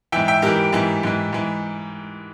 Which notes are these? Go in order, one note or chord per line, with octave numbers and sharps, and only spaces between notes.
G#2 E3 E5 G5
E5 G5
G#2 E3 G4 A#4
G#2 E3
G#2 E3
G#2 E3